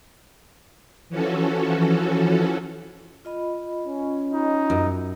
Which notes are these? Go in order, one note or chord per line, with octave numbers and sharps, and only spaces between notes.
E3 F3 C#4 F#4 A4
F4 D#5 B5
C#4
D#4
F#2